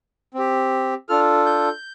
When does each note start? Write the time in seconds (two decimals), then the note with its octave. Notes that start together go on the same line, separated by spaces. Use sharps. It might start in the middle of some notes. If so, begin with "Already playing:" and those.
0.34 C4 G4
1.09 D4 F4 A4 F6
1.46 G6